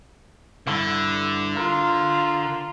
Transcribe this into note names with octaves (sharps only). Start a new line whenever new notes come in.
G2 D3 E4
F4 A#4